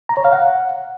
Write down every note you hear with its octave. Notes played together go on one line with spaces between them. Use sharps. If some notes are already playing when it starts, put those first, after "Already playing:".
A#5
C#5
F5
F#5